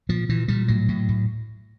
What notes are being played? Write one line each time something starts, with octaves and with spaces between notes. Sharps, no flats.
A#2 F3
A#2 E3
A#2 G3
A2 F#3
A2
A2